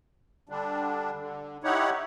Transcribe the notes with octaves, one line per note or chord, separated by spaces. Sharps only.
D3 G3 D4
D3
D#4 E4 G4 C#5 F#5